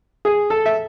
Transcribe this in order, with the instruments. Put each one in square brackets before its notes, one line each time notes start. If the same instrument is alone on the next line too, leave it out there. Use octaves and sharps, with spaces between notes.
[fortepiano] G#4
A4
E5